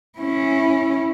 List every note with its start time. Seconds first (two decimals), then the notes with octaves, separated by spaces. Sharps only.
0.19 C#4 E4